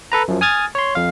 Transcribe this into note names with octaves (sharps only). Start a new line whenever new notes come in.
A4 B4 A#5
F#2 F3
G#5 D#6 F6 G#6 A6
C#5 C6
F2 F5